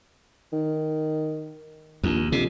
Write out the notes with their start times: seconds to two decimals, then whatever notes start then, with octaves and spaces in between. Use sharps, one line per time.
0.53 D#3
2.04 A#1 D#2
2.32 F2 C3